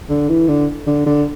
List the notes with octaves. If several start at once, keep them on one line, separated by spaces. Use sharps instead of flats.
D3
E3
D3
D3
D3